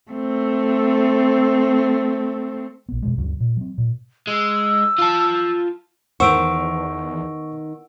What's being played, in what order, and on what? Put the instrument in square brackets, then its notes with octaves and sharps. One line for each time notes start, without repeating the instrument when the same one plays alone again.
[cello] A3 C4
[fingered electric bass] A#1 B3
F2 B2 G#3
D2 G2 C#3 F#3
A#2
F#3 C4
A#2
[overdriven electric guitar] G#3 [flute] E6
[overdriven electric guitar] F4 A5
[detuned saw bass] E2 [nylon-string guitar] D#3 B3 C5 [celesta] F#5 E6 D7 [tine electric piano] C#6